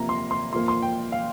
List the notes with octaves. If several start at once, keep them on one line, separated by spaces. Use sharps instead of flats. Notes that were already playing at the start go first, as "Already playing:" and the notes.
Already playing: C3 F3 A#3 A#5
C6
C6
A#2 F3 A#3 C6
C6
G5
F5